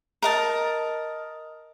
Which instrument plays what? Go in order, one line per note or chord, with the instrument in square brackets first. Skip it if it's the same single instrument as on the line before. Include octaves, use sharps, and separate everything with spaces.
[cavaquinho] A#4 D#5 A5